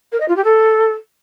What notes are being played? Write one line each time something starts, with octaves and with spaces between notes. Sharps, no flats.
A#4
D#5
F4
G4
A4